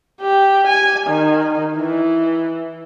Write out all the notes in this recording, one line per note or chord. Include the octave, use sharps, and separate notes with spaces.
G4
G#5
D#3
E3